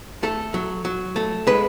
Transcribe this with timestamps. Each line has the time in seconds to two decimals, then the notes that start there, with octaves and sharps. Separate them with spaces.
0.23 A3 A4
0.54 F#3
0.85 F#3
1.16 A3
1.47 G#3 B4